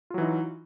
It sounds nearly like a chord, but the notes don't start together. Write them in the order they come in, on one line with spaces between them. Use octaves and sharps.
F4 F#3 E3 D#4